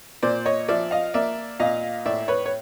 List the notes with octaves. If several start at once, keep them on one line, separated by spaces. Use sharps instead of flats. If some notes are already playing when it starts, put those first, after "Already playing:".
A#2 C5 D5
C#5 D#5
F3 D5 E5
D#5 F5
A#3 D5 E5
A#2 D#5 F5
A2 D5 E5
B4 C#5
C#5